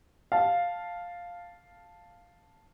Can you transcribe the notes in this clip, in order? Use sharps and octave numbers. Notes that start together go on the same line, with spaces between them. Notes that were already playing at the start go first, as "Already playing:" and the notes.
F5 A5